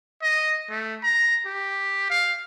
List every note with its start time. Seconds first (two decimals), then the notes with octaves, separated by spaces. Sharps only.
0.23 D#5
0.70 A3
1.03 A#5
1.45 G4
2.10 F5